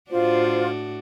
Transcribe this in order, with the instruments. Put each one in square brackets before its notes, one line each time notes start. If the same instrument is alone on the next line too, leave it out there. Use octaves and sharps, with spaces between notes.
[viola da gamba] A2 D4 F#4 [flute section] F4 C5